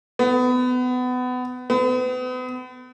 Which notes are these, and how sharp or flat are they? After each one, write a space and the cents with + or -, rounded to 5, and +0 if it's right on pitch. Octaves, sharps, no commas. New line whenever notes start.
B3 +25
B3 +40